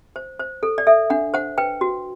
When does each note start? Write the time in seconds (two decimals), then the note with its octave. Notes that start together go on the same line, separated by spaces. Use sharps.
0.16 C5
0.40 C5
0.63 A4
0.78 D5
0.87 A4 E5
1.10 D4 F#5
1.34 C5 F#5
1.58 B4 G5
1.81 F#4